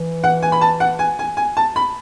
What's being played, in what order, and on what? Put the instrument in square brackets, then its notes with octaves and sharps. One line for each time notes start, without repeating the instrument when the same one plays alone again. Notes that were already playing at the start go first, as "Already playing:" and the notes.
Already playing: [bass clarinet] E3
[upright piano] F#5
G#5
B5
A5
F#5
G#5
G#5
G#5
A5
B5